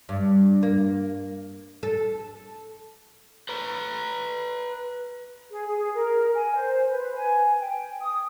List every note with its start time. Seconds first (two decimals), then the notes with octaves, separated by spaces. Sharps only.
0.09 G2
0.63 A#3
1.83 A4
3.49 B4 A#5
5.51 G#4
5.67 G#4
5.95 A#4
6.35 G#5
6.55 C5
6.89 B4
7.16 G#5
7.60 G5
8.02 D#6